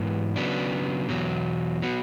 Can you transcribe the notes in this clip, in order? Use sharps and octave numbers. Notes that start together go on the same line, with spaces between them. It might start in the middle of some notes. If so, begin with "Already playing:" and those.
Already playing: G#2 E3 B3
C#3 F#3 B3 D4
E2 B2 F#3
F#3 B3 F#4